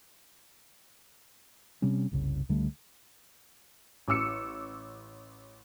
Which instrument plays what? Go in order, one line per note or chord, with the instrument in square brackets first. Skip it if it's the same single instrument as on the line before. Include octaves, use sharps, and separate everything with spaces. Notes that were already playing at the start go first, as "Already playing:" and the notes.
[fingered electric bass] C3 G3 C4 C#4
F#1 C2 C#3
C#2 D3 G3 A3
[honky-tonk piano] A1 D6 E6 C#7